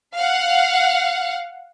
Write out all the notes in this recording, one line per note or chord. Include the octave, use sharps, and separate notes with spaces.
F5 F#5